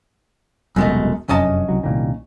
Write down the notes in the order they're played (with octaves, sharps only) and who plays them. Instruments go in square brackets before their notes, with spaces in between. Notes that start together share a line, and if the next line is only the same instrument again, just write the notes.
[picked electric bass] E1 C2 B2 [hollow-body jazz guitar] F#2 G#3 A3
[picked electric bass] F1 F#2 D4 [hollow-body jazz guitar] C#4 D#5 A5
[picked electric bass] C2 F#3
C2 A#2 D#3